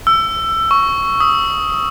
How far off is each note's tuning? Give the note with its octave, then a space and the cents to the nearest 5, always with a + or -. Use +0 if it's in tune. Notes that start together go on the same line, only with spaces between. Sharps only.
E6 +15
C#6 +5
D#6 +15